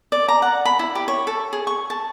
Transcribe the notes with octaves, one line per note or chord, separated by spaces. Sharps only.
D5
A#5
F#5
B5
E4
G4
C#5
A4
G#4
C#6
A5